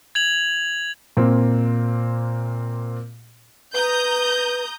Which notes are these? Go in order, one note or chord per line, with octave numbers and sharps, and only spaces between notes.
G#6 F7 F#7
A#2 A#3 C4
B4 A#5 D#6 G6